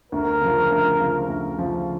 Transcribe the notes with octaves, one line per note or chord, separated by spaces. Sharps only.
D2 A#4
C#3 F3
D2
C#3 F3
D2
C#3 F3